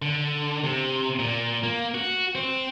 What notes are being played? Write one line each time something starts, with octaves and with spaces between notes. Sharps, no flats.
D3
C3
A#2
A#3
F#4
C4